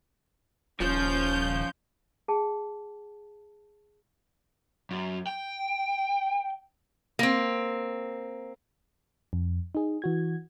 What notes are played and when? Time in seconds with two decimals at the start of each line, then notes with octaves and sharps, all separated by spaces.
0.80 D#1 F3 C#4 G6
2.28 G#4 G5 A5
4.91 F#2
5.27 G5
7.19 A#3 C4
9.33 F2
9.75 D#4 G#4
10.02 E3 F#4 G#6